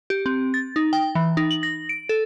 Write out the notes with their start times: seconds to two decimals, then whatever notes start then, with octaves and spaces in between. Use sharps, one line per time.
0.10 G4
0.26 C4
0.54 A6
0.76 D#4
0.93 G5
1.15 E3
1.37 D#4
1.51 F#7
1.63 A#6
1.89 D7
2.09 A4